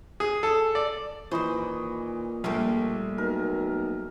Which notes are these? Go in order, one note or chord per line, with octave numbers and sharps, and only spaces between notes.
G#4
A4
D5
D#2 A#2 E3 C5 D#5 B5 C#6
A#1 G3 A3 A#3
B1 A#4